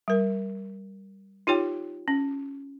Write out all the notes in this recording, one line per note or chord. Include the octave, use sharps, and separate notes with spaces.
G3 A#4
D#4 F4 G4 C#5 G5
C#4